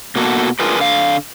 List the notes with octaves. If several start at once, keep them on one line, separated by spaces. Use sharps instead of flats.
B2 A#3 F#4 A4
D4 F4 G#4 A#4 B4
D3 F5